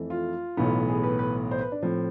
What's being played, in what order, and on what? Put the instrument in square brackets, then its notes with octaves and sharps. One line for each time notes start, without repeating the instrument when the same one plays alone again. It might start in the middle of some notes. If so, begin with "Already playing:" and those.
Already playing: [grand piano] F2 E3 A3
F4
B1 A2 E3 B3
G#4
B4
B4
C5
B4
D4
A2 F3 C4